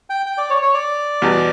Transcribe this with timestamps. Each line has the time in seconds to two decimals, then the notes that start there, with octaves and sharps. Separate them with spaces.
0.10 G5
0.26 G5
0.38 D5
0.50 C#5
0.62 C#5
0.74 D5
1.22 E2 B2 G3